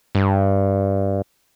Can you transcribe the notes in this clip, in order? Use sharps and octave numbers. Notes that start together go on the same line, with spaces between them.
G2